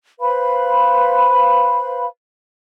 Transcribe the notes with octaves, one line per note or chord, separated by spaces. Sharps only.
B4 C5 F5 B5